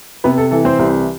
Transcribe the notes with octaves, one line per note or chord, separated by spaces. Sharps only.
C3 B3 B4
A4
E3 A4
C4 C5
C2